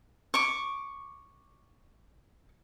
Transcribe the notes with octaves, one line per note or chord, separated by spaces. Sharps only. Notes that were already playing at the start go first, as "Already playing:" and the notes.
C#6 D6